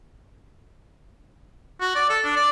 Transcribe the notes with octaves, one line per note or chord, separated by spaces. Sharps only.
F#4
D5
A4
D4
D5